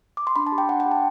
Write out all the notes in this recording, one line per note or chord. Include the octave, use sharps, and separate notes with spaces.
D6
C6
D4 B5
A5
G4
G5
D4 F#5
G5
G4
A5